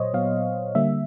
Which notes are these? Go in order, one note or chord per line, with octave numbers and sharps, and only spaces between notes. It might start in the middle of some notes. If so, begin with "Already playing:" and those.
Already playing: A#2 F#3 C5 C#5 D#5
A#2 F#3 B3 F5
D3 G3 A#3 E5